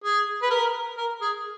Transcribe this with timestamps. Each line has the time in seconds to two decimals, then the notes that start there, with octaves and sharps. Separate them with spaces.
0.04 G#4
0.42 B4
0.50 A#4
0.97 A#4
1.21 G#4